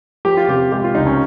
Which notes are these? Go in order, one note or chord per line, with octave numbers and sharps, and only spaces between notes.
F3 G4
F4
C3 G4
G#3 G4
F4
C#2 D#4
C#4